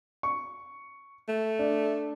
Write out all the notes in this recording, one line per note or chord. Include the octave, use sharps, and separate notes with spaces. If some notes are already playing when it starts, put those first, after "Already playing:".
C#6
A3
D4